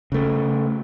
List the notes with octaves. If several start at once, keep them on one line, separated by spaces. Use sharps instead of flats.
C#3 A3